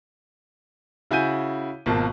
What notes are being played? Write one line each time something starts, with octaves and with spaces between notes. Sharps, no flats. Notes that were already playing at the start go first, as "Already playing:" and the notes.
C#3 E4 F#4 G#5 G6 D#7
G#1 B2 A#3 F4 A5